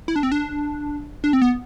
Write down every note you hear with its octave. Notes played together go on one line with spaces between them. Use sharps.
E4
D4
C4
D4
D4
C4
B3